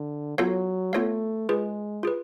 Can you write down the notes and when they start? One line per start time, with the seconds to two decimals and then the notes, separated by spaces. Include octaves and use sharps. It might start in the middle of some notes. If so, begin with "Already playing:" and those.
Already playing: D3
0.38 F#3 B3 F4 A4 C#5 F5
0.93 A3 B3 F4 A4 C#5 F5
1.49 G#3 F4 G#4 B4
2.03 F4 G#4 B4